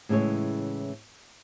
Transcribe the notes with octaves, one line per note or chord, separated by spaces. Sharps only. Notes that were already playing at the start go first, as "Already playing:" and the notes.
A2 C#3 E3 G#3 C#5